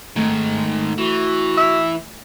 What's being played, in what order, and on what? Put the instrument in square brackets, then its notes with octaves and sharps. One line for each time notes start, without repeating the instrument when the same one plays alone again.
[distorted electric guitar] G#2 D#3 [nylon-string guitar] A3
[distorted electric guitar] E3 [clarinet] F#4
[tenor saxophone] E5